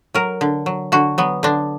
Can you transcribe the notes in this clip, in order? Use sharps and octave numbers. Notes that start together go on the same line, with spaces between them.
F#3 A#4
D3
F#3
D3 F#4
F#3 B3
D3 D4